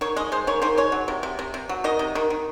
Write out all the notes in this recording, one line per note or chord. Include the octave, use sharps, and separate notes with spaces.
D#3 C#5
G#3 D#5
G#3 C5
D#3 C#5
D#3 C5
G#3 C#5
F#3
C3
C3
C3
C3
F#3
D#3 D#5
C3
D#3
D#3